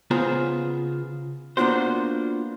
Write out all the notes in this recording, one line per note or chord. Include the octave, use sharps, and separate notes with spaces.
C#3 B3 F4 G#4 C5 A#5
A#3 B3 D4 F4 F#4 C5